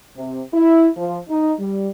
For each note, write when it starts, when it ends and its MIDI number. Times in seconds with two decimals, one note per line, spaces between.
0.16 0.42 48
0.53 0.88 64
0.97 1.18 53
1.29 1.53 63
1.59 1.87 55